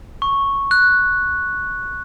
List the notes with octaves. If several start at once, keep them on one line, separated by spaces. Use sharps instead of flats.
C#6
F#6